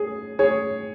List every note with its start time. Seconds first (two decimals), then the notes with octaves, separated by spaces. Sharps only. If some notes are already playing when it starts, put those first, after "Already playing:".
Already playing: G#4
0.39 G#4 C#5